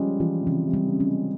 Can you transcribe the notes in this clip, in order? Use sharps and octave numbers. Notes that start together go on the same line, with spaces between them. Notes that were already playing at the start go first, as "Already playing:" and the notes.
Already playing: F3 G3 G#3 C#4
E3 F3
C3
C#3 E3
C3
G3
C#3
C#4
G#3